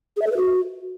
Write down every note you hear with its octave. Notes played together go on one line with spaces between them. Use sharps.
G#4
E5
A4
B4
F#4